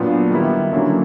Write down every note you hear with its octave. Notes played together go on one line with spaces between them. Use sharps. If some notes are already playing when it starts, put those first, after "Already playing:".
Already playing: A#2 F#3 B3 D4 F4
D#3 G3 B3 E4
D3 F#3 A#3 C#4